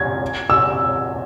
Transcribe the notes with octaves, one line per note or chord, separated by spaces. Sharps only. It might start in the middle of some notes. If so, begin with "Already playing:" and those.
Already playing: G#6
E6